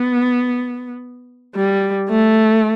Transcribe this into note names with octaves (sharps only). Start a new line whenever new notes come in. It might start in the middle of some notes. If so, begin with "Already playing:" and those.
Already playing: B3
G3
A3